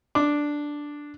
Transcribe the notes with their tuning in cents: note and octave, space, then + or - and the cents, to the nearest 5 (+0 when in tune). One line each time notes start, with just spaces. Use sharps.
D4 +0 D6 +0